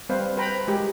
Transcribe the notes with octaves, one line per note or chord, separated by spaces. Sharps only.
G3 C4 B4 C5 F5
B4 C5 G5 A#5 B5
G#3 G4 A#4